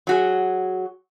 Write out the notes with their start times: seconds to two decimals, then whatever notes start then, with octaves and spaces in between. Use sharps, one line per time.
0.07 F#3 F#4 G#4